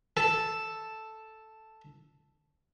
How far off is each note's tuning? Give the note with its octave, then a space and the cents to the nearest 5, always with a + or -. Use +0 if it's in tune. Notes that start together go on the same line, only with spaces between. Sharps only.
A4 +0 A5 +0